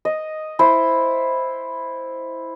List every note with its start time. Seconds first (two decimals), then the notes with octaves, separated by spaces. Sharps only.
0.05 D#5
0.59 E4 C5